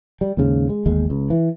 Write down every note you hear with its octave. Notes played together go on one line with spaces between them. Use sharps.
G3
D#2 G#2 C#3
G#3
G1 D#2 G#3
C#2
E3